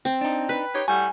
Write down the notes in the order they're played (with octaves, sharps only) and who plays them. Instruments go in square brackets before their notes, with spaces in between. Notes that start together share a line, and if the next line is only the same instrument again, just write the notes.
[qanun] C4
[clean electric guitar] D4 D#4
[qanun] B4
[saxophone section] D#4 G4 C#5
[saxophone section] A2 G3 F#4 [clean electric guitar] G#5